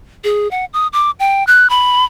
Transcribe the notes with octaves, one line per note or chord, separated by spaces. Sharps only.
G#4
F#5
D#6
D6
G5
F#6
B5